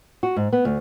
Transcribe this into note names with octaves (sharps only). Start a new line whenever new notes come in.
F#4
G#2
B3
D2